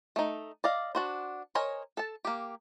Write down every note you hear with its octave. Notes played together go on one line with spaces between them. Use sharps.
A3 D#4
D5 D#5 F5
D4 F#4 C5
A#4 C5 C#5 D#5 G#5
A4 A5
A#3 G4